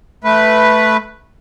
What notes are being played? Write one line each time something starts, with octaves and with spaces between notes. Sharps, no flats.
A3 B4